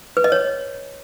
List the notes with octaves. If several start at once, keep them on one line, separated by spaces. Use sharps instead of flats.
B4
D#5
C#5